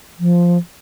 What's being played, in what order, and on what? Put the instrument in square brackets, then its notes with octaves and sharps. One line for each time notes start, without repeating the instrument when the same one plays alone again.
[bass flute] F3